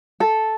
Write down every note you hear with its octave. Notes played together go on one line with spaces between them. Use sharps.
A4